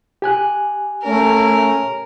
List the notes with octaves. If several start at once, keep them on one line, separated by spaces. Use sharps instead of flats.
G4 G#5 F#6
A3 C#4 A#4